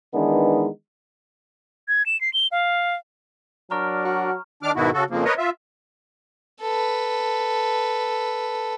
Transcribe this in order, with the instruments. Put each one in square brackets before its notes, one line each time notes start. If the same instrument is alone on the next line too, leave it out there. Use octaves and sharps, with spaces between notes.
[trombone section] D#3 E3 G#3 B3 D4 D#4
[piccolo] G#6
E7
C7
G7
F5
[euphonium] F#3 [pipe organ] D4 A#4 [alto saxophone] D5 [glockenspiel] A#5 C#6 F6
[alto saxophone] F#4
[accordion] D#3 D4 D6 F6
G#2 B2 D#3 B3 E4 F#4
C#3 F#4 A4
F2 C#3 F3 A#3
A#4 B4 C#5 D#5
F4 E5
[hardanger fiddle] A4 B4